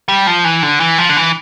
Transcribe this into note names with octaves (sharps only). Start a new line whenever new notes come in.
G3
F3
E3
D3
E3
F3
D3
E3